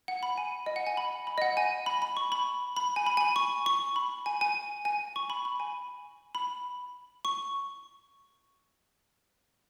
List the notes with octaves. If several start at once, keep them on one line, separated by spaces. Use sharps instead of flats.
F#5
B5
G#5
D#5
F#5
G#5
B5
B5
D#5
F#5
G#5
B5
B5
C#6
B5
B5
G#5
B5
G#5
B5
C#6
C#6
B5
G#5
G#5
G#5
C#6
B5
B5
G#5
B5
C#6